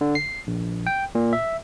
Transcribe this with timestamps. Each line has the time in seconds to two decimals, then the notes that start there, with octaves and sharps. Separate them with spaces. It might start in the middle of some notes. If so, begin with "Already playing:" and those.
0.01 D3
0.15 C7
0.47 A#1
0.87 G5
1.15 A#2
1.33 E5